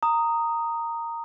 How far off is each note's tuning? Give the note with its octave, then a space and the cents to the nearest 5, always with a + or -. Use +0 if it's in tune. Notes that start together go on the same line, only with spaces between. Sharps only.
A#5 -10 D#6 +0